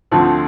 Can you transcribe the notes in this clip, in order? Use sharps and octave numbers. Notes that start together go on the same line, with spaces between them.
D2 D3 F3 A3 C4